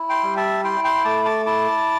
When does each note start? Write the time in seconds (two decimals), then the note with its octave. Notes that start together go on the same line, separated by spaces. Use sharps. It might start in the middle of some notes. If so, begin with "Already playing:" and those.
Already playing: E4
0.09 G5 C6
0.23 G3
0.36 E5 A5
0.64 E4 G5 C6
0.84 G5 C6
1.05 A3 A5 D6
1.25 A5 D6
1.46 E4 A5 D6